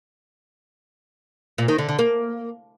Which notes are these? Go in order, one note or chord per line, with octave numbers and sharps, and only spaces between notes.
A#2
D#3
D3
D3
A#3